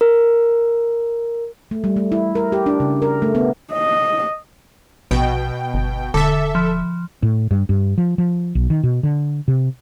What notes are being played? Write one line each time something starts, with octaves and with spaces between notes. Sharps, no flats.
A#4
A3
G3
A3
E4
A#4
G4
D4
C#3
A#4
A3
B3
D#5
A#1 B2 G5
G1
E1 D3 A4 E5
F3
A2
G2
G2
F3
F3
B1
D#3
B2
D3
C3